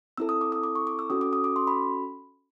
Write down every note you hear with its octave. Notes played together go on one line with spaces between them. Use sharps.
C4 E4 A4 E6
D#6
D6
D#6
D6
C#6
D6
E6
C#4 F#4 A4 D#6
D6
D#6
D6
C6
B5